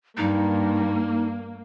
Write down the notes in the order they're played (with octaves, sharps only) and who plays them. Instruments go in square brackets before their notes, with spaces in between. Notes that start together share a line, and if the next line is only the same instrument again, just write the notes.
[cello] G2 [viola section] A#3 [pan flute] D#4